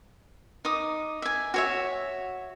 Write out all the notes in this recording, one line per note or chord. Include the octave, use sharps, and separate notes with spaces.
D#4 D6 D#6
E5 G#5
F#4 C#5 E5